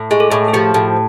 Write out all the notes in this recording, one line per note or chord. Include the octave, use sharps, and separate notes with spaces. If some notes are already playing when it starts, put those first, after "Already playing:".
Already playing: A2
G#3 G#4
A4
A2 G#4
G#4
F3 G4
A2